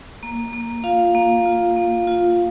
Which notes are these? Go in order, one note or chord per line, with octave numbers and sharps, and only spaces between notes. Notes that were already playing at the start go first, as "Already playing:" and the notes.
A#3
A#3
F4 F5
A#3
F4
A#3
F4